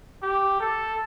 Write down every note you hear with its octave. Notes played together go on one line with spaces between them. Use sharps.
G4
A4